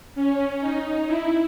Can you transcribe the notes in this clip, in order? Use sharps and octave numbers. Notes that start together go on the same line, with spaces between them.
C#4
D#4
E4